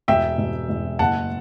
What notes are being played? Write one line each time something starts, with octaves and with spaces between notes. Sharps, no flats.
E1 E5 G5
E1
E1
F#1 F#5 A5